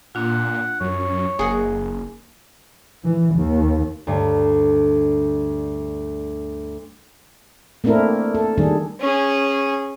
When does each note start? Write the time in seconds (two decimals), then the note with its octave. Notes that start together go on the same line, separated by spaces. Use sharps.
0.15 A#2 D4 F4 F#5
0.80 F#2 C#5
1.39 F#1 A#3 G#4 A#4 F#5
3.04 E3
3.35 D#2
4.07 D2 G2
7.84 A3 A#3 C4 D4 E4 A#4
8.35 A4
8.58 D#3 G3 D4 G#4
9.00 C#4 G#4